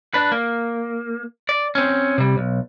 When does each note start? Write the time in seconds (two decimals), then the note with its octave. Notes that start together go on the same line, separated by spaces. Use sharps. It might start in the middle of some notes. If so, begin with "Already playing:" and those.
0.14 D4 B4
0.32 A#3
1.49 D5
1.75 C4 C#4
2.18 C3 G3
2.38 B1